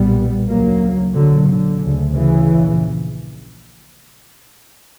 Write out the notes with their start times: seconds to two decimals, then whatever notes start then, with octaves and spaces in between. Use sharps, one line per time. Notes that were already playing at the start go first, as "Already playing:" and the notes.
Already playing: B1 A#2 G3 B3
0.49 D2 C#3 F#3 A#3
1.15 B1 A#2 D3 F#3
1.48 D3
1.81 D2 C#3
2.14 C#3 E3
2.48 A#1 A#2